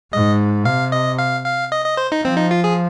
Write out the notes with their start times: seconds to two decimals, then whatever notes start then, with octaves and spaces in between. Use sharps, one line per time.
0.13 G#2 D#5
0.65 C3 F5
0.92 D#5
1.18 F5
1.46 F5
1.72 D#5
1.85 D#5
1.97 C5
2.12 D#4
2.24 F3 C4
2.37 D#4
2.51 F4
2.64 G#4